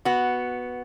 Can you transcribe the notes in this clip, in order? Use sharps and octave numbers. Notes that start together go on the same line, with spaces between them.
B3 F#4